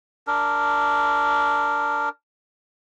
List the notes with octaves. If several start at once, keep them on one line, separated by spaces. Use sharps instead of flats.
D4 A#4